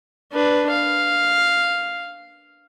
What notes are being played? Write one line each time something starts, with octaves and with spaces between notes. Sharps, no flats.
D4 B4
F5